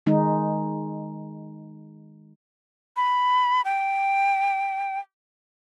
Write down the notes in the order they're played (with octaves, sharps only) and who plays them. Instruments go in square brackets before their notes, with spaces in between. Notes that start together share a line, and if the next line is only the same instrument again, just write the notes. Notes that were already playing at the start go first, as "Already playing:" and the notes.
[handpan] D#3 G#3 D#4
[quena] B5
G5